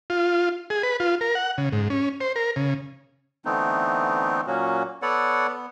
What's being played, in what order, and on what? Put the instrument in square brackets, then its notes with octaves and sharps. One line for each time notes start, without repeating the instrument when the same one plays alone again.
[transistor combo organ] F4
G#4
B4
F4
A#4
F#5
C#3
G#2
C#4
C5
A#4
C#3
[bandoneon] D3 E3 A3 B3 C4 D#4
A#2 F#3 A#3 C#4 F#4
B3 A4 B4 C#5 D5 F#5
B3